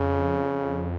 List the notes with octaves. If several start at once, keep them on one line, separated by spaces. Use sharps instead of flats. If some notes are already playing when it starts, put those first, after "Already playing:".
Already playing: F2 C#3